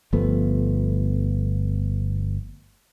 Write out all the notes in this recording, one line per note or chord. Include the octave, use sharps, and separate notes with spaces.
G1 F3 A3 B3